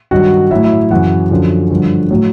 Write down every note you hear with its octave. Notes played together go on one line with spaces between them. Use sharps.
G2 D#3 F#3 F#4 F#5
A2 F#3 E4 E5
E4 E5
F#2 C#3 E3 F#4 F#5
F#2 D3 F3
G2 D3 F3
A2 F#3